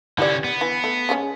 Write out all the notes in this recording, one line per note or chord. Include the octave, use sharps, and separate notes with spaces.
D3 C#4 E4 G4 D5
B3
E3
A3
C#3 G#3 C#4